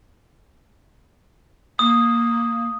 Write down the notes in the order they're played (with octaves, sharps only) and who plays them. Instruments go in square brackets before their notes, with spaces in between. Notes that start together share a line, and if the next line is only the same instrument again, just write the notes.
[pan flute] A#3 [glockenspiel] D#6